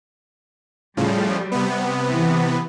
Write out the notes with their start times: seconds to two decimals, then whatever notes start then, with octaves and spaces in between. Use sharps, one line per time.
0.97 A2 C#3 F3 G3
1.52 C3 B3
2.08 E3